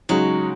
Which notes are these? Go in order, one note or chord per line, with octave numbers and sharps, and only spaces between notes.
C#3 F#3 G#3 D#4 F#4